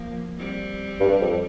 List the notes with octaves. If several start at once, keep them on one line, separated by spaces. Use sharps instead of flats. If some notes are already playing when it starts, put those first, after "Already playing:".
Already playing: F3 A#3
G3 C4
G2
F2